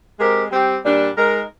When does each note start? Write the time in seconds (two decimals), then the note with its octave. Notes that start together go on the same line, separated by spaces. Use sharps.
0.18 G#3 C4 G4 A#4
0.51 G3 C4 G4
0.84 A#2 G3 D4
1.16 G#3 D#4 A#4